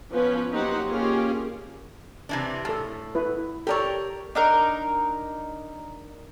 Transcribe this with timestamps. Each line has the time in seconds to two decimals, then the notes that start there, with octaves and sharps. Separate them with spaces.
0.13 F3 B3 C#4 B4
0.51 F#3 A#3 D#4 G4 C5 F#5
0.89 A#3 C#4 F4 G4 G#4
2.29 C3 E3 D4
2.65 A2 A4 A5
3.15 E4 B4
3.67 G4 A4 A#4 C#5 D5
4.35 D4 D#4 A#4